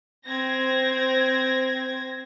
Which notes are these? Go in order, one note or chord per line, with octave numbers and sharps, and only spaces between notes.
C4 G#6 A#6